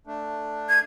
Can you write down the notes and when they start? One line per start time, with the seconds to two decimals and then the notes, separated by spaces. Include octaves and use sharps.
0.07 A3 D4
0.69 G#6